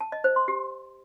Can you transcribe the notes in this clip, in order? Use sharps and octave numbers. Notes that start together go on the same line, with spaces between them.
A5
D#5
C5
C6
G4